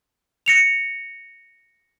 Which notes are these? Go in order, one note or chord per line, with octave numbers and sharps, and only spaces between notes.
A#6 C#7 F7